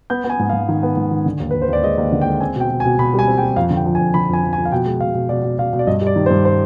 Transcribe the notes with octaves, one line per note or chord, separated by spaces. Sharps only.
B3 G6
B3
G#5
G#2
G#2 F5
D#3
B3
G#2
D#3
D3
D#2
D#2 B4
C5
D#2 D5
G#3 D#5
D#2
D3
G5
G#3
C4 G#5
B2 G5
B2
G#5
B2
B2 B5
G3 G#5
C4
G5
G3
F2 F5
D3
G5
F3
G#5
F2
D3 B5
F2 G#5
F3
G#5
F3
F5
B2 G5
G#3
B2 F5
B2
B2 D5
B2
B2 F5
B2
D5
G2 D#5
G3
D5
D#3
C5
G2
C5